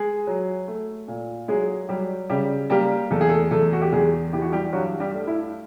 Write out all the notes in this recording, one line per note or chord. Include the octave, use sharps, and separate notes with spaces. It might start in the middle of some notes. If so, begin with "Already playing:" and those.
Already playing: G#3 G#4
F#3
A3
A#2
F#3 G#3 G#4
F#3 G3 G4
C#3 G3 G4
G3 A#3 G4
E2 A4
G#4
A3 A4
E2 A3 A4
F#4
G4
E2 G#3 G#4
E3 G4
F#4
G3 G4
G2 F#3 F#4
G3 G4
A3
E4